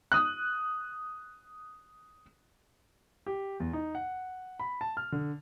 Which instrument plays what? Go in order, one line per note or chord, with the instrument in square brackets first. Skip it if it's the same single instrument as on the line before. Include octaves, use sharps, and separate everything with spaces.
[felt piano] D#6 F#6
[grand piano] G4
E2
D#4
F#5
B5
A5
F6
D3